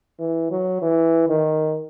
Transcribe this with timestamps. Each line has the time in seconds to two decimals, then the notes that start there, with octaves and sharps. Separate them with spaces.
0.20 E3
0.51 F#3
0.82 E3
1.28 D#3